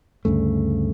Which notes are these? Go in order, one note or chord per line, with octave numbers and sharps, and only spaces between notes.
D2 G2 C#3 A3